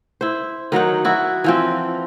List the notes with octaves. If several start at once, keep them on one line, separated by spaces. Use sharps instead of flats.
E4 C5
D#3 F#3 D#4 F#5
E4 F#4
E3 F3 C4